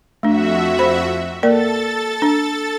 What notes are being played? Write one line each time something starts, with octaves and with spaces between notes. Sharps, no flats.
F2 A3 D4 F#4 E5
C5 B5
A#3 A4 A#4 D5 A6
D4